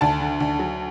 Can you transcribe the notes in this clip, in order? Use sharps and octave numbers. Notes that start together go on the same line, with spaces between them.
D2 A5
D3
D2
F#3